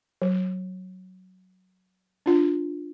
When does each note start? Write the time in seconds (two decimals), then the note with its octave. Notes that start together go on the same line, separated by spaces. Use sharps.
0.22 F#3
2.26 D4 F4